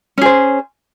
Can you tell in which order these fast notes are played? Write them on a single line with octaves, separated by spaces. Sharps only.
C#4 G#4 C5